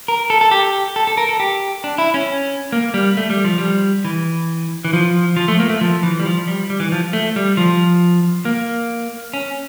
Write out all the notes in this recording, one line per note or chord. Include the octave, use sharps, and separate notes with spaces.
A#4
A4
A4
G4
A4
A4
A#4
A4
G4
D4
E4
C#4
A#3
G3
A3
G3
F3
G3
E3
E3
F3
F3
A3
A#3
A3
F3
E3
G3
F3
G3
G3
E3
F3
A3
G3
F3
A#3
C#4